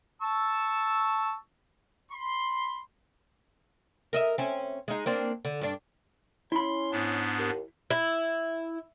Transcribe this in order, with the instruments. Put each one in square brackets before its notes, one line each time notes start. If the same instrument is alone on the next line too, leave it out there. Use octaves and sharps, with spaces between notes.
[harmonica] A5 C#6 E6
[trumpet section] B5 C6
[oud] A#4 D#5 E5
C4 C#4
G#3 D#4
A#3 C4 D4
D3
G2 D4
[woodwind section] C#4 [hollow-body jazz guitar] E4 B5 [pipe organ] C6
[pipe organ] G#2 B3 D4
[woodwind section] D#2
[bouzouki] E4